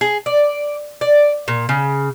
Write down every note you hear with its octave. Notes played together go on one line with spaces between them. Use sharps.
G#4
D5
D5
A#2
C#3